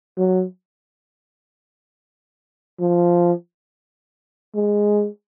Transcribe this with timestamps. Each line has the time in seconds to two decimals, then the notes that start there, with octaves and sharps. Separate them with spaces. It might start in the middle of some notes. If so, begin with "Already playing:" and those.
0.17 F#3
2.80 F3
4.55 G#3